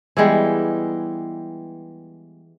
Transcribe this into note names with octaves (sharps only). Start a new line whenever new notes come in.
E3 G3 G#3 B3